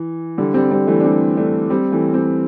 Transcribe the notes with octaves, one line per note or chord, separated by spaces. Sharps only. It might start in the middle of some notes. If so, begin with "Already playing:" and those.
Already playing: E3
D3 G3
G3 C4
G3 C4
E3 A3
D4
G3 C4
A3 D4
G3 C4
E3 A3
G3 C4